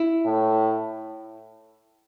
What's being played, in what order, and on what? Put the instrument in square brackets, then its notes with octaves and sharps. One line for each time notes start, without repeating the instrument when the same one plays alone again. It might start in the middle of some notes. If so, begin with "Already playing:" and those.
Already playing: [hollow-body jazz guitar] E4
[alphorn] A2